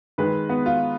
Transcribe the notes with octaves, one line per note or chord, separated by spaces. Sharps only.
D#3 G#3 B4
B3
F4